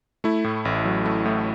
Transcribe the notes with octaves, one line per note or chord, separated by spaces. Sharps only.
A3 E4
A2
A1
F#3
A3
A2